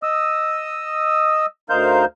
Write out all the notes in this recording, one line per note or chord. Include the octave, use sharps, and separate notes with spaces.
D#5 D#6 E6
D2 D#4 A#4 C5 F5 G6